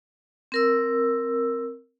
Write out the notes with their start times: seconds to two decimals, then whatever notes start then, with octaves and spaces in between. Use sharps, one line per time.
0.52 C4 A#4 E6